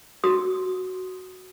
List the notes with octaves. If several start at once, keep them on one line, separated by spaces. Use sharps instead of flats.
F#4 D#6